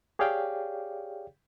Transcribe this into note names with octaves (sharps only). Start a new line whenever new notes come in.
G4 G#4 C#5 D5 F5 G5